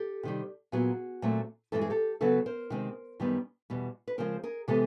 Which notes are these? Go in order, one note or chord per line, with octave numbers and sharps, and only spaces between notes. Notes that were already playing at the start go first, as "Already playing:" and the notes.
Already playing: G4 A4
C3 D#3 G3
A#2 F#3 B3 F#4 G#4
A#2 F#3 A3 C4
G2 E3 G#3 C4 A4
G#4
G4 A4
C#3 F#3 B3 A4 B4
A#4 C5
C3 D#3 G#3 C4
F#2 D#3 G3 B3
E2 B2 G3
B4
C#3 F3 G#3 C4 A#4 C5
G#4 A#4
C3 E3 G#3 B3 G4 A4